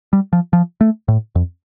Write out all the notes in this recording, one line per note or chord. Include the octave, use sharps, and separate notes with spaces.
G3
F3
F3
A3
A2
F2